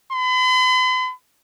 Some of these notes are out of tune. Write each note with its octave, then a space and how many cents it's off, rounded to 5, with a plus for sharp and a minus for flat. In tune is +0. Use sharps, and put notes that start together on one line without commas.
B5 +45